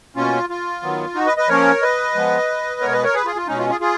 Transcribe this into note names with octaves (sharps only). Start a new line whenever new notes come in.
B2 A#3 C#4 F4
F4
D#3 F#3 B3
D#4 F#4
B4 D#5
B4 D#5
F3 A#3 C#4 A#4 C#5
B4 D#5
F3 G#3 B3
B2 G#3 B3 A#4 C#5
B4 D#5
A#4 C#5
G#4 B4
F4 G#4
F4
B2 G#3 C#4 D#4
F4
F4 G#4
F4 G#4